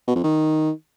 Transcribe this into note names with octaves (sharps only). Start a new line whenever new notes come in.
B2
F2
D#3